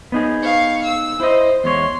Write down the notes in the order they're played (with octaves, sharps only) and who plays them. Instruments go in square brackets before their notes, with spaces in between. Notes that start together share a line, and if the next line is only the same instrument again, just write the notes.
[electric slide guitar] B3 D#4 G#4
[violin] F5 C#6
E6
[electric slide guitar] E4 D#5 [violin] C5
[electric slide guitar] E2 G#3 C#5 [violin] C6